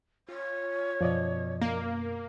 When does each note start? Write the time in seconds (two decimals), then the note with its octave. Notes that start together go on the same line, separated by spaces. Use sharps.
0.29 F4 C#5
1.01 F#2 B2 F3 D5 D#5
1.62 A#3